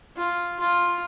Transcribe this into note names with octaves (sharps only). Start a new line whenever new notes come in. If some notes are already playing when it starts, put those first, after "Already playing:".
F4
F4